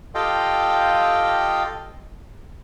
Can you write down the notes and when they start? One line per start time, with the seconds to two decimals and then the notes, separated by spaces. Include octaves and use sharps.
0.15 F4 G4 A4 D#5 F5 G5